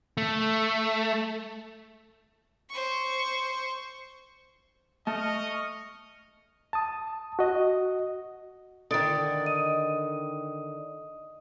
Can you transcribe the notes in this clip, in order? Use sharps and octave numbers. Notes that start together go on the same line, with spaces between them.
A3
C5 C#6
A3 D#5 A5 C#6 F6
A5 D#6
F#4 D#5
D3 D#3 D#6 A6 D7
D#5 D#6 D#7